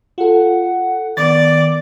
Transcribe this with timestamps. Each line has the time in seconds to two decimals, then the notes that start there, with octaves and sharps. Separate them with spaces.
0.18 F4 A4 F#5
1.17 D#3 B3 D5 A6